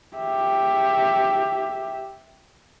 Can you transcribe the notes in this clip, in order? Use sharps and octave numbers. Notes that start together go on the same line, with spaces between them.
G4 E5